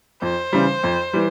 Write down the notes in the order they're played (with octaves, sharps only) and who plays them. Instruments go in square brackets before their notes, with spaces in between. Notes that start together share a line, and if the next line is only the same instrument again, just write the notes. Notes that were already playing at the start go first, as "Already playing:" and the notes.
[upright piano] F2 [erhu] C5
[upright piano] C#3 E3 G3
F2
E3 G3